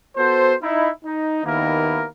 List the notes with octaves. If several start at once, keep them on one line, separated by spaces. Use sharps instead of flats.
B3 F#4 A4 C5
D#4 E4
D#4
D#2 D#3 A#3 B3 E4 A#4